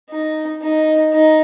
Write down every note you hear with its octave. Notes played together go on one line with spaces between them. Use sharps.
D#4
D#4
D#4